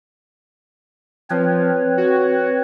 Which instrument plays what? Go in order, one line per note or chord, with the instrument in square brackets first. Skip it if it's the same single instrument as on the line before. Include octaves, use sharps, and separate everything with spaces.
[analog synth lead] F3 [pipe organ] C4 B4 C#5
[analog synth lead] F#4